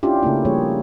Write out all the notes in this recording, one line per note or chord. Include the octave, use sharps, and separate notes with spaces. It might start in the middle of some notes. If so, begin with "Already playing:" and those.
C#4 D4 E4 F4 G4
C#3 A3 A#3 E4
F3 G3 A#3 D4 G#4 C#5